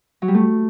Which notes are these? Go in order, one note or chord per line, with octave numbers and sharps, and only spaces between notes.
F#3
G3
A3